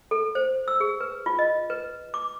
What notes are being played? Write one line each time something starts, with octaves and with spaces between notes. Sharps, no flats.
A4
C5
E6
G#4
B4
F4
D#5
B4
D6